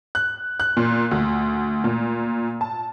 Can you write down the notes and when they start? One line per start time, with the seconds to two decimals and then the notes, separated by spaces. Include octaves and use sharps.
0.15 F#6
0.60 F#6
0.77 A#2
1.11 D2
1.84 A#2
2.61 A5